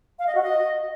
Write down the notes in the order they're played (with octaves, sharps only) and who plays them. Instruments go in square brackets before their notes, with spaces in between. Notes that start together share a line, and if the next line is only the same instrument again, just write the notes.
[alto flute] F5
D#5
F#4
D#5